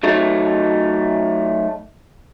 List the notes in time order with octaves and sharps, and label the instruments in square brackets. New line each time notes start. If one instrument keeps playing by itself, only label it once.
[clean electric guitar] F#3 A3 D#4